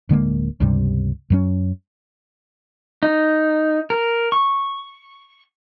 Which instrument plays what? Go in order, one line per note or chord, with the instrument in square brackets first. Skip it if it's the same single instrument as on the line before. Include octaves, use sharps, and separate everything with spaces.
[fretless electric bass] D1 D3 G#3 A#3
C#2 G2 C3 G3
F#2 F#3 C#4
[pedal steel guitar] D#4
A#4
C#6